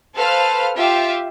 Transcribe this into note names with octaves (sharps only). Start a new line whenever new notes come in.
A4 B4 C5 F5 F6
F4 G4 E5